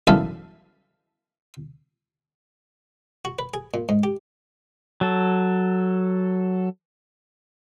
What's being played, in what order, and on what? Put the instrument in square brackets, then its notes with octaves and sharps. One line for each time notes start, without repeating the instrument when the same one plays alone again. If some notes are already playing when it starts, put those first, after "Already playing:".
[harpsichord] B1 F#2 E3 A4 F5 B5
F#4
B4
G#4
A#2
G#2
G4
[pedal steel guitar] F#3 A4